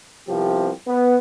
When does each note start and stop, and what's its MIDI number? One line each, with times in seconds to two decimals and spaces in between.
0.27 0.70 36
0.27 0.70 48
0.27 0.70 53
0.27 0.70 59
0.27 0.70 67
0.86 1.16 59